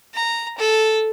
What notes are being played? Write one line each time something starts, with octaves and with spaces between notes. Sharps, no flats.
A#5
A4